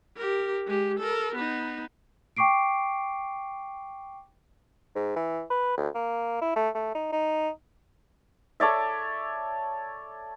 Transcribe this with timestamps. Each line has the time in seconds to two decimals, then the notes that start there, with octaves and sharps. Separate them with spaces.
0.16 G4 A#4
0.66 G#3 G4
0.99 A4 A#4
1.35 B3 D#4
2.37 G5 C#6 D6 C7 D7
4.95 G#2
5.16 E3
5.50 B4
5.77 D2
5.95 A#3
6.41 E4
6.56 A3
6.75 A3
6.95 D#4
7.12 D#4
8.60 A4 C#5 D5 E5